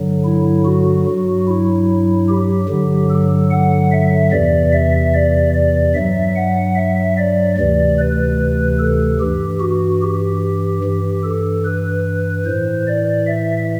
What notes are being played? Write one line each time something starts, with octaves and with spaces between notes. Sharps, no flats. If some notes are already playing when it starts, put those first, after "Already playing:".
Already playing: G2 D3 F#3
E4
F#4
G2
F#3
E4
G4
G2 D3 F#3
A4
F#5
E5
E2 C3 E3 D5
E5
D5
D5
G2 F#3 E5
F#5
E5
D5
D2 C3 E3 D5
B4
A4
G2 E3 G4
F#4
G4
G2 E3
A4
B4
A2 E3 C5
D5
E5